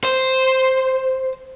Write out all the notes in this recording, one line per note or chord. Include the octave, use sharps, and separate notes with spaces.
C5